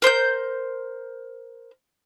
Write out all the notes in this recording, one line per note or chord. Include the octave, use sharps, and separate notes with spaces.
A#4 C5 E6 G6